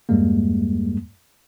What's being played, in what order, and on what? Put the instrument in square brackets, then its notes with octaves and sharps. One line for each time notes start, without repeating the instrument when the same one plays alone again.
[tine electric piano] E2 G2 G3 G#3 A#3